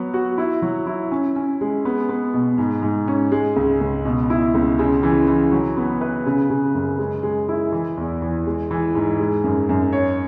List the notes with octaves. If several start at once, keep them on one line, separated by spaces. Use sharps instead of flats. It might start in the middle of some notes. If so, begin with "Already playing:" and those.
Already playing: F#3 B3
F#4
E4
F#3
E4
C#4
C#4
G#3
B3
B3
B2
G#2
G#2
C#4
G#3
C#2
C#2
B2
E4
C#2
C#3
E3
E3
F#3
B3
B4
C#3
C#3
F#2
G#3
G#3
E4
E3
E2
E3
G#3
E3
G#2
G#3
F#2
F#2
C#5